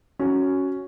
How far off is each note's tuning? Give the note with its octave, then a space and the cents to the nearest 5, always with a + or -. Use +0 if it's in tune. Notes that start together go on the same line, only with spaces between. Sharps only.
C#4 +0 F#4 +0